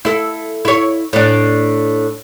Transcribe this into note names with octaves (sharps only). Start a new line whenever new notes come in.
E4 A4
E4 C#5
A2 D4